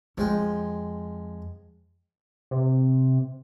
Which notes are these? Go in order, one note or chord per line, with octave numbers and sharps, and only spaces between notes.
F2 F3 G#3 G5
C3